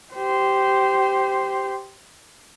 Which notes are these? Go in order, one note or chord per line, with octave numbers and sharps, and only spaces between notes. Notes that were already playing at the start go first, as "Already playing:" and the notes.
G4 C5